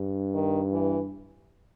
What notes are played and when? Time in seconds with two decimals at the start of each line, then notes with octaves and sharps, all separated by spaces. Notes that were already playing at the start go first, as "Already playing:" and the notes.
Already playing: G2
0.34 D#3
0.72 E3